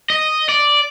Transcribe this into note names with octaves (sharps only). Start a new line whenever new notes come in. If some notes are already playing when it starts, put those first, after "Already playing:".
D#5
D5